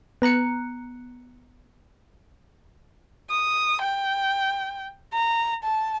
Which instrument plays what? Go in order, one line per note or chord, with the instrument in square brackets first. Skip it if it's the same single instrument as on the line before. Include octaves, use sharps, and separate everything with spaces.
[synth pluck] B3 A#5 F#6 C#7
[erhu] D#6
G5
A#5
A5